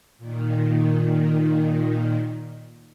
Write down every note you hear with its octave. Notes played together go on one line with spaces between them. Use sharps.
A#2 D#3